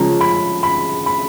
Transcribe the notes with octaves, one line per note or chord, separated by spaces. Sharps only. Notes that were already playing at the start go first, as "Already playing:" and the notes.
Already playing: C#3 F3 G#3 C#4 A#5
B5
B5
B5